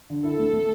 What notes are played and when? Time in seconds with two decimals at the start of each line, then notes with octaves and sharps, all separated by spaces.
0.10 D3
0.24 E4 A4
0.39 A3
0.53 A3